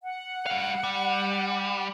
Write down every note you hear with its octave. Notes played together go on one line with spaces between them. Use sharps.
F#5
G3 F5
G3